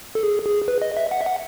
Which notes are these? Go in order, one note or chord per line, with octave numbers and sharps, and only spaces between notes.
A4
G#4
G#4
B4
D#5
E5
F#5
E5
F#5